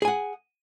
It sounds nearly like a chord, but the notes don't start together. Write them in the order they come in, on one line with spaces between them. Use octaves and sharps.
G#4 G#5 F#5